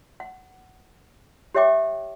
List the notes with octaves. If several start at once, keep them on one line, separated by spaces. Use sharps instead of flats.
F#5
G4 C#5 E5 G5 D6